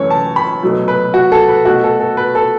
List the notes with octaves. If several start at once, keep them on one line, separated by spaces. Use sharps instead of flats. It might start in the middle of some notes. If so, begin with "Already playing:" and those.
Already playing: F#2 E3 A3 C#5
A5
B5
B2 F#3 A3
B4
F#4
A4
B4
B2 A3 F#4
A4
A4
B4
A4